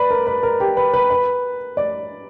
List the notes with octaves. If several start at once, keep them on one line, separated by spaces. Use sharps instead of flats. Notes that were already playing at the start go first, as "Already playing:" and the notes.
Already playing: B4 D5
A#4
B4
A#4
G4
B4
B4
B4
D5